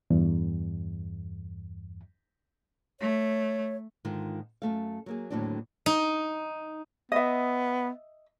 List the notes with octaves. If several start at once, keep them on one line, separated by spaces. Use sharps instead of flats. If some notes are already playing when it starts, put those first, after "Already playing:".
E2 G2
A3 C#5
G#2 D3 D#3 F4
F#2 F3 A3 F5
F#3 A#3 G#4
D#2 A2 D3 F#3 C4 D4
D#4
B3 D#5 E5